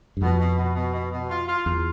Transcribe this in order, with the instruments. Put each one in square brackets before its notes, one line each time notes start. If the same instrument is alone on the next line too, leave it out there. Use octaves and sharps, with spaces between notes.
[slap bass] G2
[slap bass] F2 [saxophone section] B2
[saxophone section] B2
B2
B2
B2
B2
F4
F4
[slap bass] E2 [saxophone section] F4